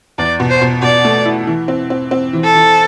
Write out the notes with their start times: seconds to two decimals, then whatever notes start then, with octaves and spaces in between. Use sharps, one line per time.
0.18 E2 D5
0.40 B2
0.50 C5
0.62 B2
0.83 B2 D5
1.05 A3
1.25 E4
1.47 E3
1.68 C4
1.90 C4
2.11 C4
2.33 E3
2.44 A4
2.55 E3